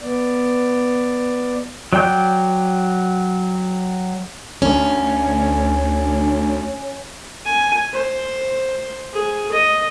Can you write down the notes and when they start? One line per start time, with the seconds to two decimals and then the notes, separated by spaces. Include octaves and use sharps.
0.01 B3 D5
1.93 F#3 D5 G5 G6
4.62 D2 C#4
7.45 G#5
7.93 C5
9.13 G#4
9.52 D#5